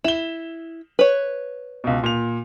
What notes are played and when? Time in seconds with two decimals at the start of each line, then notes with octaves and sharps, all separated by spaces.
0.04 E4 E7 G7
0.99 B4 C#5
1.84 C#2 B2
2.03 A#2 F7